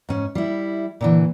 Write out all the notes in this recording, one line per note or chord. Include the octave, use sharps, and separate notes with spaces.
G#2 C#4
G3 E4
A#2 D3 E3